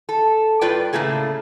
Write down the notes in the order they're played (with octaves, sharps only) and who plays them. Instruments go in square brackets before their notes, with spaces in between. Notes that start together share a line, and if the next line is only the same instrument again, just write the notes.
[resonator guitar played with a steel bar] A4
G2 F4 B4 D5 G5
A2 C#3 A3 A#3 G#4